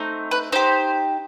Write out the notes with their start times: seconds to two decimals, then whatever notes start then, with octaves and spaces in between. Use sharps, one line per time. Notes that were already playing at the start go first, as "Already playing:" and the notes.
Already playing: A3 C4 D#4
0.31 B4
0.52 D#4 G4 C5